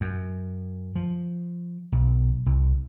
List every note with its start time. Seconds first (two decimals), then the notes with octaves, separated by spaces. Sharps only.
0.01 F#2
0.96 F3
1.92 B1
2.46 C2